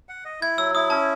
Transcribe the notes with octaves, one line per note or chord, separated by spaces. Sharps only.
F#5
D#5
E4 G#6
F#3 E6
E4 D#6
C#4 A5